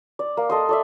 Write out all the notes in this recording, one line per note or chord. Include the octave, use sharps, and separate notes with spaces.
D5
A#3
A4 D#5 C6
A4 D5 E5